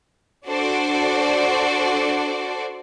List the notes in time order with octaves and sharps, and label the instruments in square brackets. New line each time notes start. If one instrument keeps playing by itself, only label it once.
[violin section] D4 F#4 A4 C5 D5